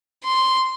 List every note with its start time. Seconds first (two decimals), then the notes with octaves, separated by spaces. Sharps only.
0.24 C6